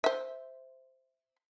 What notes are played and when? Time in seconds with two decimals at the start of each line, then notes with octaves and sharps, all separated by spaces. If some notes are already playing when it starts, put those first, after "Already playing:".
0.04 C5 E5